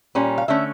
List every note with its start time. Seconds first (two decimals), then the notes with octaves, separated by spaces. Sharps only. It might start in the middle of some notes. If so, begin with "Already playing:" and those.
0.15 A#2 G3 C#4
0.38 F5
0.48 D3 A3 C#4 E5